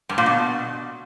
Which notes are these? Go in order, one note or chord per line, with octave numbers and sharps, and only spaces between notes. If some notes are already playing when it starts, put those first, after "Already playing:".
G2
A#2
B2